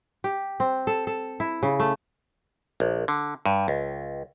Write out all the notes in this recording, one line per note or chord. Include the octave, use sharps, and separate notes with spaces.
G4
C4
A4
A4
E4
C#3
A3
A#1
D3
G2
C#2